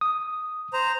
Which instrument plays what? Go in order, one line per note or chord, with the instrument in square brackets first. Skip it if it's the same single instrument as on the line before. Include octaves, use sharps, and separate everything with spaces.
[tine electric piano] D#6
[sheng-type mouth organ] C5 A#5